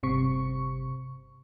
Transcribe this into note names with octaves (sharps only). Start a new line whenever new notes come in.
G1 C3 C#6